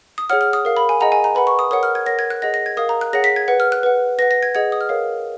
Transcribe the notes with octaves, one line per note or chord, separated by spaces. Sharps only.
D#6
G#4 C#5 F#5 F6
F6
D#6
A#4 F5
B5
G#5
G#4 D#5 F#5 A#5
G#5
A#5
B4 F#5 B5
C#6
D#6
A#4 C#5 F#5 D#6
F6
G#6
A#4 C#5 F#5 A#6
G#6
F#6
G#4 D#5 F#5 A#6
A#6
G#6
A#4 F5 D#6
A#5
F#6
G#4 C#5 F#5 A#6
B6
G#6
B4 F#5
F6
F#6
B4 F#5
B4 F#5 A#6
A#6
G#6
G#4 D#5 F#5 G#6
D#6
F6
A#4 C#5 F5